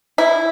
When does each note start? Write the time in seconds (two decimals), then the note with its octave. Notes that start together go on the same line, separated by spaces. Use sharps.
0.18 E4